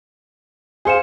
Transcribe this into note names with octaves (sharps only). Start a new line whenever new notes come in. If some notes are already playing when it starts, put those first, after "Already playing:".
G#4 C5 F5 G#5 C#7 E7